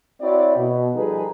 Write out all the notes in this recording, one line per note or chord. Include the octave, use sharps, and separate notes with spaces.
C4 E4 F#4 C#5 D5
B2
F3 G3 D#4 G#4 A4 B4